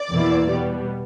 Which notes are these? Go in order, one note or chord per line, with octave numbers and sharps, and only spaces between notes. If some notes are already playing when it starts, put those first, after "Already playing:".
Already playing: D5
E2 B2 A#3 E4
B2 G3 B3